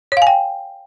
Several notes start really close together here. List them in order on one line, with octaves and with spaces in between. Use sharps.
C#5 F5 G#5 G5